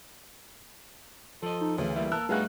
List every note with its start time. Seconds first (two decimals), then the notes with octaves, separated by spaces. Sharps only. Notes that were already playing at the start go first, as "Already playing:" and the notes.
1.43 F3 A4 D#5
1.61 D#4
1.78 D2 C#3 E3
1.96 G3 A#3 E4
2.12 A#3 A#4 A5 E6 F#6
2.29 G2 A3 B3 D#4 F4 F#4 G#4 F#6